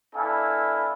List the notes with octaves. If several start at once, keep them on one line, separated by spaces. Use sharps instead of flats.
B3 D4 E4 A4 F5 G#5